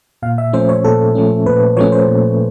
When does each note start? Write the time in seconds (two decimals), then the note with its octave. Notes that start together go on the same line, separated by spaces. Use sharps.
0.22 A#2 F5
0.38 E5
0.53 F3 A3 C#4 C5
0.69 C#5
0.84 A#2 A4
1.15 F3 A3 C#4
1.46 A#2 B4
1.77 F3 A3 C#4 C#5
1.92 C5
2.08 A#2